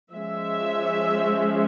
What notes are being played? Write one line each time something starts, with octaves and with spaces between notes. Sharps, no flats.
F3 G#3 C#4 E5